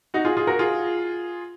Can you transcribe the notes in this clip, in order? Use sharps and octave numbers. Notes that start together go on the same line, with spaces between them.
D#4 F#4
F4 G#4
F4 G#4
F#4 A#4
F4 G#4